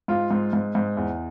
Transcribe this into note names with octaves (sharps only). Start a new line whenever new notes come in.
G#2 F4
G#2
G#2
G#2
E2